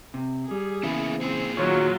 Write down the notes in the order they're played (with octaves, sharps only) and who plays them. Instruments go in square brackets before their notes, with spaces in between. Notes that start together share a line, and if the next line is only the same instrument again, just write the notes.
[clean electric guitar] C3
[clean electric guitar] G3 [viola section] G#4
[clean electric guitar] C#3 E3 [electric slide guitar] A#3 B3 E4
[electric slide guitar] A#2 G#4 [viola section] C4
[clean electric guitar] D#3 C#5 [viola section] F#3 F4